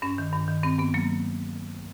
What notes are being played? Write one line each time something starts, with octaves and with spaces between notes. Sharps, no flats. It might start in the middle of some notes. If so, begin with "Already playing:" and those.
G2 C#4
D#3
G2
D#3
G2 C4
G2 B3
F#3 A#3